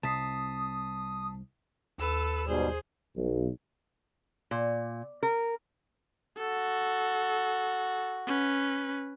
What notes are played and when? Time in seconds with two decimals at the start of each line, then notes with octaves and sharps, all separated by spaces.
0.03 C2 A5 D#6 B6 C7
1.98 D#2 A4 B4 E6
2.46 G#2 B2 G3 G#4 C5
3.17 B1
4.51 A#2
5.23 A#4
6.38 F#4 A4
8.27 C#4 B4